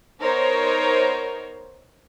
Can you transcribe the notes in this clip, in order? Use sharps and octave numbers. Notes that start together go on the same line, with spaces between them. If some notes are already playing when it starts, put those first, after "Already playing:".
B3 D#4 A#4 C5 C#5